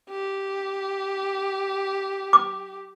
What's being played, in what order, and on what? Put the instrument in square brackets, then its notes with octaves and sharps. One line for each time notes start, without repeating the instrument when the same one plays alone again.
[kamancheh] G4
[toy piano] D6